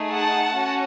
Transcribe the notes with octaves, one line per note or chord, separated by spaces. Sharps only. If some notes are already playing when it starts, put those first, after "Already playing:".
Already playing: A3 D#4 G#4
F#5 A5
C#4 F#4